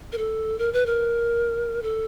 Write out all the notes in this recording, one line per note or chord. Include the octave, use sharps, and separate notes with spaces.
A#4
A4
A#4
B4
A#4
A4